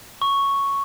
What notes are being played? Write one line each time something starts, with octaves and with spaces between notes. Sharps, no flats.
C#6